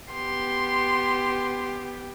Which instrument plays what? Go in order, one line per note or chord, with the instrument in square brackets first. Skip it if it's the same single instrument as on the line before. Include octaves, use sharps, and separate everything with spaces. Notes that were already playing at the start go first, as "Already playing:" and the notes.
[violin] B3 G4 [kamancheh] C6